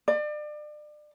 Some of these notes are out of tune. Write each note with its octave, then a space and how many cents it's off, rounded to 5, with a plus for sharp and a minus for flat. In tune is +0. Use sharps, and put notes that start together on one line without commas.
D5 +35